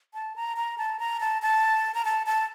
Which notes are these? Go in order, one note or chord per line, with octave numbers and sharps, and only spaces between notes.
A5
A#5
A#5
A5
A#5
A5
A5
A#5
A5
A5